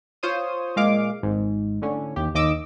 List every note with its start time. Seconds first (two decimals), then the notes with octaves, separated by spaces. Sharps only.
0.23 F4 C5 C#5 D#6
0.76 A#2 G#3 F5 D6
1.23 G#1 G#2
1.82 A2 D3 C#4
2.16 D#2 G4
2.35 D#2 D#5 D6 E6